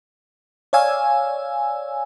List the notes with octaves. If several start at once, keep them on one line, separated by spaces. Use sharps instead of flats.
C#5 D5 F5 G#5 E6